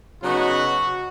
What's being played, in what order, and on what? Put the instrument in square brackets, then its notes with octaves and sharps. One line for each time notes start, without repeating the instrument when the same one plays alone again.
[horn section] C#3 F#3 B3 D#4 F#4